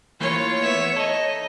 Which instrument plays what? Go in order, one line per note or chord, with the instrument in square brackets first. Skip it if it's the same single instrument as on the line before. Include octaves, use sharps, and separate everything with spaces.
[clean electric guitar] E3 A3 A#3 [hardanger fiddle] F4 [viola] C#5
[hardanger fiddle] B3 E5
[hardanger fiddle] D#4 D#5 [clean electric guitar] A4